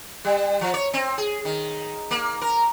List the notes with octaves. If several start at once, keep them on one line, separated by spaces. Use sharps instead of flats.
G3
F3
C#5
C4
G#4
D#3
A#3
A#4